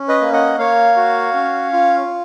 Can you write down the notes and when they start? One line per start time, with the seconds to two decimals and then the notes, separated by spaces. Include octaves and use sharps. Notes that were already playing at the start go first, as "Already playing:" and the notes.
Already playing: C#4
0.08 B4 D#5
0.21 A#3
0.33 D#5 F#5
0.58 A#3 C#5 F5
0.97 F#4
1.34 C#4
1.73 F4